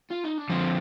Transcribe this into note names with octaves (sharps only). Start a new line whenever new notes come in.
F4
D#4
D4
D3 F3 C4